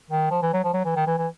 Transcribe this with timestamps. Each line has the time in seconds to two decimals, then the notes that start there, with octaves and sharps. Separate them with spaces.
0.10 D#3
0.31 F3
0.43 E3
0.53 F#3
0.64 F3
0.74 F#3
0.85 E3
0.96 D#3
1.07 E3
1.18 E3